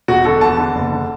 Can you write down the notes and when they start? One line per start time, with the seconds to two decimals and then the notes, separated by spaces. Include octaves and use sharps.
0.08 E1 F#4
0.25 D3 A4
0.41 E2 A5
0.59 D3
0.75 F#1
0.92 D3